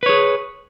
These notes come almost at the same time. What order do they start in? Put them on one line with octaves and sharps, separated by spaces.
B4 C#5 G#4